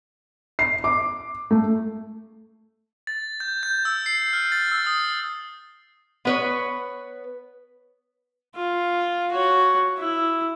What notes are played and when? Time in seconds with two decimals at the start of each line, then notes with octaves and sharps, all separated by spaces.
0.59 C7
0.84 D6
1.51 A3
3.07 A6
3.40 G6
3.63 G6
3.85 E6
4.06 C7
4.33 F6
4.52 A6
4.72 E6
4.87 D#6
6.25 B3 B4 C#5
8.55 F4
9.32 F#4 C#5
9.98 E4